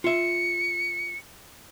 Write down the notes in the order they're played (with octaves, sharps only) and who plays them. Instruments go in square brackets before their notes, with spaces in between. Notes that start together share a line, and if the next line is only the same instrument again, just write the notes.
[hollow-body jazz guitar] F4 E5 [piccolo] C#7